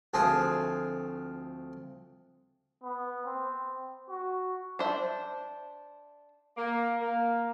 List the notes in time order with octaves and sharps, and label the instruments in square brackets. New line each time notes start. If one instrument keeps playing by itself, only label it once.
[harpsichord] D2 F3 C4 G#4
[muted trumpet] B3
C4
F#4
[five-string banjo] D4 C5 E5
[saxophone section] A#3
A#3